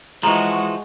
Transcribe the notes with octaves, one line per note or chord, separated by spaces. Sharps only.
E3 F3 G#3 F#4 A#5